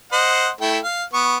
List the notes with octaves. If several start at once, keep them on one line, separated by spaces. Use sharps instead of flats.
C5 D#5 F#5
A3 E4 G5
F5
B3 C#6